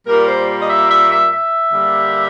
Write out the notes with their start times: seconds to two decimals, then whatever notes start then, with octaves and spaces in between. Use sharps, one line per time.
0.06 A#2 G3 A#3 A#4
0.28 C5
0.62 D#5
0.69 E5
0.90 E5
1.11 E5
1.31 E5
1.72 D3 G3 A#3